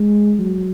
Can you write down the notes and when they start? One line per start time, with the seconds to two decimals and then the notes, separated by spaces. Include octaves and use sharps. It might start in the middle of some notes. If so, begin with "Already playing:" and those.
Already playing: G#3
0.39 F#3